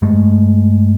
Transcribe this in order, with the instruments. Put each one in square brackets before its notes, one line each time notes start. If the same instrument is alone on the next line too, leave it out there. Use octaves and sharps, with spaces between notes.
[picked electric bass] G2 G#3 A3